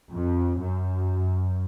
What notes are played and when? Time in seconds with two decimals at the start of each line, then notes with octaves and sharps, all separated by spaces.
0.12 F2
0.60 F#2